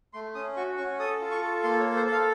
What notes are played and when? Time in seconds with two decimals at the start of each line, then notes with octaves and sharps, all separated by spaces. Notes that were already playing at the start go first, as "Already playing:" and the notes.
0.13 A3 C6
0.35 C#4 D#6
0.56 F#4 C#6
0.77 C#4 C#6
0.99 A4 D#6
1.21 F4
1.31 C#6
1.42 A4
1.63 A#3 C6
1.80 C#5
1.85 A4
1.96 C5
2.06 A4
2.12 F5